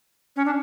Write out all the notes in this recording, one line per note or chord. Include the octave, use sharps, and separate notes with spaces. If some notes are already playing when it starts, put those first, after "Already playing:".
C#4
D4